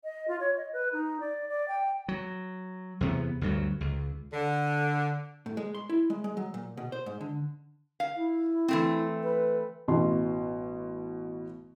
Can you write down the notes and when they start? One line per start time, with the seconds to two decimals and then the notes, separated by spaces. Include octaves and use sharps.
0.04 D#5
0.28 F4
0.40 C#5
0.57 D#5
0.73 B4
0.93 D#4
1.20 D5
1.49 D5
1.68 G5
2.08 F#3
3.01 E2 C3 B3
3.41 D2 G2 F#3
3.81 C#2
4.33 D3
5.46 A2
5.57 G#3
5.75 C6
5.89 E4
6.10 G#3
6.24 G#3
6.37 F#3
6.54 A#2
6.77 B2
6.92 C5
7.06 G#2
7.21 D3
8.00 F5
8.16 E4
8.68 E3 A3 C4
9.23 B4
9.88 A1 B2 C6